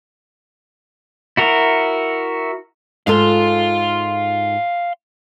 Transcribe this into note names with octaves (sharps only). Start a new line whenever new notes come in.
E4 F#4 A#4
G#2 F4 A4 F5 C6